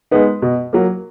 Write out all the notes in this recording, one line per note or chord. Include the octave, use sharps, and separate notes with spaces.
G#3 B3 D#4
B2
F#3 A#3